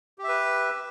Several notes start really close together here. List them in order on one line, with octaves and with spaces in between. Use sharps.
G4 E5 B4